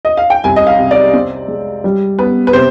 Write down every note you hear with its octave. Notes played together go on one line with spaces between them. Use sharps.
D#5
F5
G5
C2 G#5
D#5
F5
C3
D5
C4
G#3
G3
B3 B4
B4
C3 C5